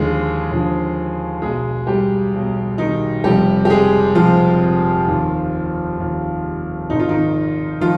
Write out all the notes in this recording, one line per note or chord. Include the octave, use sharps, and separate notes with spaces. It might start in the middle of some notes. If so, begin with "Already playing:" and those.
Already playing: D#2 D3 F3 G#3 G#4
D#2 D3 F3
B1 B2 G#3 G#4
G3 G4
B1 B2
D#3 D#4
F1 F2 C3 F3 G3 G4
G4
G#3 G#4
F1 F2 C3 F3 F4
D#2 D#3
D#2 D#3
G#1 G#2 D#3 D#4
F4
D#3 D#4
D#3 F3 F4